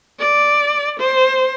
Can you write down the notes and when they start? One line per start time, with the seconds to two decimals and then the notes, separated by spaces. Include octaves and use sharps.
0.19 D5
1.00 C5